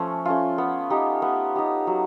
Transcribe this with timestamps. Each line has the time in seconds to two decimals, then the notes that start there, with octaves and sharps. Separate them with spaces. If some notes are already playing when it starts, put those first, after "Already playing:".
Already playing: F3 A3 C#4 F4
0.25 A3 C#4 F4
0.58 B3
0.90 D#4 G4
1.22 B3
1.56 D#4 G4
1.87 F#3